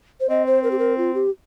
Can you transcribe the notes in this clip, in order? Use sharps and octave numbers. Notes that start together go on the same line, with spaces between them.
C5
C4 D#5
C5
A#4
G4
A#4
F4
G4